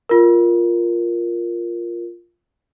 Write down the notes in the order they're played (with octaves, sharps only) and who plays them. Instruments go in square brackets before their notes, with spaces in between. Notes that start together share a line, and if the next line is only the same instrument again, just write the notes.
[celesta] F4 A#4